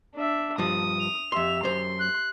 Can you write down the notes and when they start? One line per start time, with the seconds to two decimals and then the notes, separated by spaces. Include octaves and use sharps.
0.15 D4 E5
0.58 G2 F3 D#6
1.00 F7
1.32 F2 G4 E5 C6
1.63 F#2 C5 C6
1.99 F#6